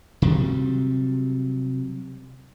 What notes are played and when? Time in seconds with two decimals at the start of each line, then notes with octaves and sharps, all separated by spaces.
0.22 C3 F#3 G3